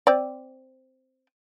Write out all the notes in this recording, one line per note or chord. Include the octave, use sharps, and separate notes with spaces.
C4 D5